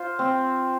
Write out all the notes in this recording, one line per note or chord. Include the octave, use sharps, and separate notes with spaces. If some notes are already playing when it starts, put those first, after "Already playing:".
Already playing: F4 C5
C4